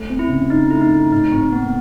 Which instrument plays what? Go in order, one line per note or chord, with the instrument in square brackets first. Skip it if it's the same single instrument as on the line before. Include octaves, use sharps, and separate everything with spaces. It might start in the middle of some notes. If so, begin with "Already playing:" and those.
Already playing: [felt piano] A3
C4
[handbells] E4
[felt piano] C#3
[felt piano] C#3 [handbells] D#4
[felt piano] A3 [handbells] E4
[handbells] D#4
[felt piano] A3
[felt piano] A2 [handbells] D#4
[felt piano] A2 [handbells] C4
[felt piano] A#3 [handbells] B3